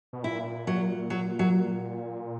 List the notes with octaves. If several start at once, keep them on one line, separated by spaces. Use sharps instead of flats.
B2
A#2 E4
F#3
F#3
F#3